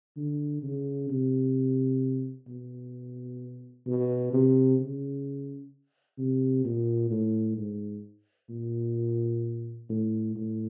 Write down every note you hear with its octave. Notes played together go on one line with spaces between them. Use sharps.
D3
C#3
C3
B2
B2
C3
C#3
C3
A#2
A2
G#2
A#2
A2
A2